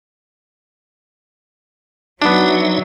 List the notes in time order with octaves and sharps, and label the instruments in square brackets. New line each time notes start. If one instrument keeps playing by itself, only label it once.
[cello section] F#3 [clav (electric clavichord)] B3 D4 [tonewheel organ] D#4 E5